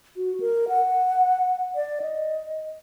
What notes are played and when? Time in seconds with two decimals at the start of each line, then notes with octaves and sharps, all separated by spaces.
0.17 F#4
0.40 A#4
0.69 F#5
1.75 D5
2.02 D#5